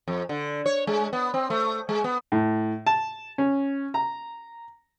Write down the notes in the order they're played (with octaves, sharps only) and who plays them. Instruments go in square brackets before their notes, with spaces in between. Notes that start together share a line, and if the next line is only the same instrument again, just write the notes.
[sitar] F2
D3
C#5
G#3
B3
C4
A3
G#3
B3
[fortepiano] A2
A5
C#4
A#5